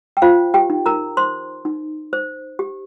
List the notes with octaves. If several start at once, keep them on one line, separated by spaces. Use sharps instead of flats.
G5
F4 C5 F5
G4 G5
D#4
A#4 A#5
C5 C6
D#4
C5
G4